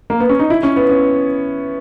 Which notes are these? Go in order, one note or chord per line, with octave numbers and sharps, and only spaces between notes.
A#3
B3
C#4
D#4
E4
C#4
B3
C#4